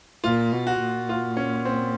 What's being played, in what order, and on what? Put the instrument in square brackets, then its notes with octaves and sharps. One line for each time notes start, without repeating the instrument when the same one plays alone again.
[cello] A#2 [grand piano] F4
[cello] B2
[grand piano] F#4
[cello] A#2
[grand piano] F4
C#4
C4